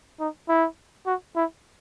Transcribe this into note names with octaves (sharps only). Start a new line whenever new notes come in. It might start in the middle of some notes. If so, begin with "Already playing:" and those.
D#4
E4
F#4
E4